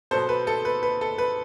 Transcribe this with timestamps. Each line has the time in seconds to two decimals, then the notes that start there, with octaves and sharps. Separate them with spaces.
0.11 B2 F#3 B3 A4 C5
0.29 B4
0.47 A4
0.65 B4
0.83 B4
1.01 A4
1.18 B4